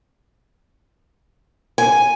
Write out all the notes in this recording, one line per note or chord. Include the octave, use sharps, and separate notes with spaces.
G#5